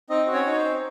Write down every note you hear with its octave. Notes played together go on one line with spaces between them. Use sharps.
C4 D#4 D#5
F#4
C#4 C#5
D#4 C#5
C5
C4